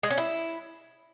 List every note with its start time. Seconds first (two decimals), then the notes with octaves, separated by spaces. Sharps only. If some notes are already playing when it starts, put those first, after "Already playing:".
0.03 G#3
0.10 C#4
0.18 E4